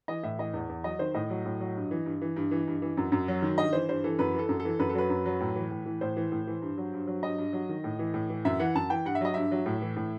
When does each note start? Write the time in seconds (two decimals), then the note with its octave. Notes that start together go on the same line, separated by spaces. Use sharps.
0.08 E3 D#5
0.23 A2 E5
0.39 E3 D#5
0.54 E2
0.69 E2
0.84 F#3 D#5
0.99 D#3 C5
1.14 A2 D#5
1.30 F#3
1.46 A2
1.60 F#3
1.76 G2
1.91 E3
2.06 G2
2.22 E3
2.36 G2
2.51 E3
2.67 G2
2.82 E3
2.97 F#2
3.12 F#2
3.28 F#3
3.42 D#3
3.57 G2 D#5
3.73 E3 C5
3.89 G2 C5
4.04 E3 A4
4.19 F#2 B4
4.34 E3 A4
4.49 F#2
4.60 A4
4.65 E3
4.79 F#2 B4
4.89 A4
4.95 F#3 B4
5.10 F#2
5.26 F#3
5.40 A2
5.56 E3
5.71 A2
5.86 E3
6.01 A2 C5
6.17 E3
6.32 A2
6.47 E3
6.62 G2
6.78 F#3
6.93 G2
7.07 F#3
7.23 G2 D#5
7.38 G2
7.53 F#3
7.69 D#3
7.84 A2
7.99 E3
8.14 A2
8.29 E3
8.45 F#2 E5
8.60 E3 F#5
8.75 F#2 A5
8.90 E3 G5
9.05 G2 F#5
9.15 E5
9.21 F#3 D#5
9.34 G2 E5
9.52 F#3
9.66 A2
9.82 E3
9.96 A2